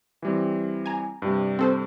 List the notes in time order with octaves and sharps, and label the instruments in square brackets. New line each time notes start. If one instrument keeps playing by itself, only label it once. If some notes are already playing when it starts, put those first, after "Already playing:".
[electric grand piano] E3 G3 C4
[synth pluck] G#5 A#5
[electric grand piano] G2 C3 G3
[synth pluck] C4 A4 C5